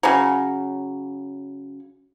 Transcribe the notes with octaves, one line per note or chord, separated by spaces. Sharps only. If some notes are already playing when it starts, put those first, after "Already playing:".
C#3 F#3